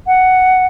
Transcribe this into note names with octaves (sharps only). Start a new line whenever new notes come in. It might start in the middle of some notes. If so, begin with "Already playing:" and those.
F#5